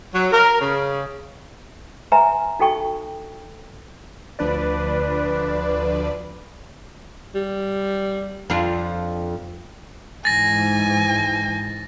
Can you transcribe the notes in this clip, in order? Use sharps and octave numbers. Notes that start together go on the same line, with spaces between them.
F#3
A#4
C#3
B4 E5 G#5 A#5 C6
D#4 F#4 A4 G5 C#6
D2 F3 D4 B4 D5
G3
F2 D4 F4
G#2 E3 G#5 A6 A#6